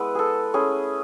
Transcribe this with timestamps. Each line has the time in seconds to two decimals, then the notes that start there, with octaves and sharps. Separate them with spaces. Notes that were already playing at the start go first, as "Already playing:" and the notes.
Already playing: G#3 B3 E4 B4
0.15 G#4 A4
0.54 A3 C#4 E4 G#4